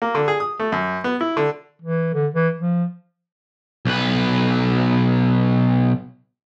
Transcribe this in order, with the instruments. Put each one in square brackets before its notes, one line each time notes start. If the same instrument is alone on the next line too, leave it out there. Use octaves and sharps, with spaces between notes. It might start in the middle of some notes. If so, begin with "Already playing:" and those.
[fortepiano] A#3
D3
G#4
D#6
A3
F#2
B3
E4
D3
[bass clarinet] E3
D3
E3
F3
[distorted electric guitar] B1 B4